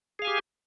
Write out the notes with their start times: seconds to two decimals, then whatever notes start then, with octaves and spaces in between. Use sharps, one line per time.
0.19 G#4
0.22 F5
0.25 G#5
0.27 G4